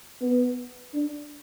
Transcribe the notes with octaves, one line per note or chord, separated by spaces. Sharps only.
B3
D4